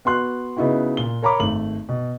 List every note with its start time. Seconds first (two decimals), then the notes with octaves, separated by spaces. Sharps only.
0.05 B3 F#4 C6 F#6
0.57 C#3 B3 D#4 E4 F#4
0.97 A#2 G7
1.22 A#4 C#5 A#5 B5 D6
1.40 G#1 A3 F#7
1.89 B2